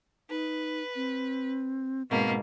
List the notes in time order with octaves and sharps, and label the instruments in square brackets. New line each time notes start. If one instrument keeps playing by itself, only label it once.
[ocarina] D#4 [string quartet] B4
[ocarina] C4
[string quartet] G#2 B2 A#3 [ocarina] C4